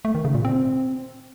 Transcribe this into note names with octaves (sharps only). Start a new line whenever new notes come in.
A3
D#3
C#3
A#2
C4